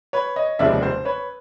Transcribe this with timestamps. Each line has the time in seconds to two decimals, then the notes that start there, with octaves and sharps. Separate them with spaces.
0.13 B4 C#5
0.36 C#5 D#5
0.59 F1 D#2 C#3 F3 G#3 D5 E5
0.83 C5
1.05 B4 C#5